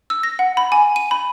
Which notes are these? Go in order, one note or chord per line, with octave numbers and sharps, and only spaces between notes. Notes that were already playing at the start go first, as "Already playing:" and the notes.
E6
A#6
F#5
B5
G#5
D#7
B5